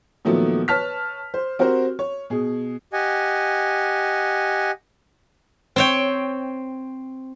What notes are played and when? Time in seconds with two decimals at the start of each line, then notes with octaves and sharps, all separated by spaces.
0.25 A#2 D#3 F3 F#3 A3 B3
0.68 B4 C#5 A5 F6 B6
1.34 C5
1.59 C4 F#4 G4 A#4 C5
1.99 C#5
2.30 B2 G#4
2.93 G4 D#5 F#5 G#5
5.76 C4 C#5 G5